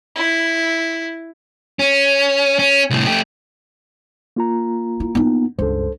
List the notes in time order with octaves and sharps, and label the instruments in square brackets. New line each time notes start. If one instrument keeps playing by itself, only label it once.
[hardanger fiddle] E4
[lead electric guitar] C#4
C#4
C2 A2
A3 G4
[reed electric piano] A#3 F4 A#5
[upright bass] E4
B3 D#4
[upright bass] C#2 G2 [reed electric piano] A4 C5